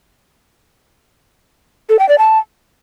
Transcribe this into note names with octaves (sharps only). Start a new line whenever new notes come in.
A4
G5
D5
A5